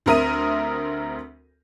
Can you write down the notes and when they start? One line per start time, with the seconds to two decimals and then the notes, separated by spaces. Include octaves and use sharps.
0.06 D2 C4 A#4 E5 D#6 D#7